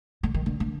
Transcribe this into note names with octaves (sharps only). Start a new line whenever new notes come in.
D3
D#3
D3
D3